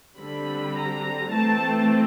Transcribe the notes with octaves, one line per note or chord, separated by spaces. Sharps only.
D3 G3 C4 B5
A#5
E3 A3 C4 A5